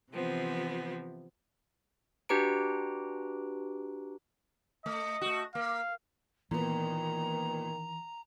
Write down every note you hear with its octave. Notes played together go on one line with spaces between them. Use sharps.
C3 E3 F3 B3 C4
D4 F#4 G4 B4 A#5 D7
A3 D#5
A3 F#4
A#3 F5
A#2 D#3 E3 B3 A#5